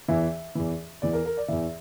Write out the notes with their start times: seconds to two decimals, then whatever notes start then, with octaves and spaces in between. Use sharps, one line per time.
0.08 E2 E3 E5
0.55 E2 E3
1.02 E2 E3 D5
1.13 A#4
1.26 A#4
1.37 D5
1.48 E2 E3 E5